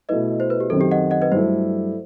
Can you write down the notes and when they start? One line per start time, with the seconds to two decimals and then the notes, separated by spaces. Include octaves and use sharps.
0.09 B2 A3 E4 B4 D#5
0.40 C5
0.50 B4
0.60 G4
0.70 F#2 D#3 F#3 C4 A4
0.81 G4
0.91 D#5 F#5
1.11 D#5 F#5
1.22 B4 D#5
1.32 G2 F#3 A3 E4 A4 C5